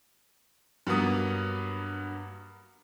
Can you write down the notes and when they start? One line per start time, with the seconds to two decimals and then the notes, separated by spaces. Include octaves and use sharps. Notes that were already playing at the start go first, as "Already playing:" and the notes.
0.87 G2 F#3 A#3 B3 D#6